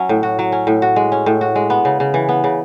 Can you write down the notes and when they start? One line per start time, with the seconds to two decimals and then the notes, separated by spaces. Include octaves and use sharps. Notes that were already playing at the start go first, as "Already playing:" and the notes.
Already playing: F#3 C#4
0.09 A2
0.23 F#4
0.39 F#3
0.52 C#4
0.67 A2
0.82 F#4
0.96 G#3
1.12 C#4
1.26 A2
1.41 F#4
1.56 G#3
1.70 B3
1.85 C#3
2.00 C#3
2.14 E3
2.29 B3
2.44 C#3